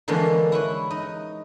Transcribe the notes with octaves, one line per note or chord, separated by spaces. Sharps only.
D3 E3 F3 G#3 A#3 C#4
E4 B4 C#5
D#4 D#5